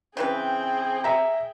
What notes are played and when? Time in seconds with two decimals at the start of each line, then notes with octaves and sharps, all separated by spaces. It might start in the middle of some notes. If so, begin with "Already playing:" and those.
0.17 C#3 E3 C4 G#4 B4 G5
1.04 E5 A#5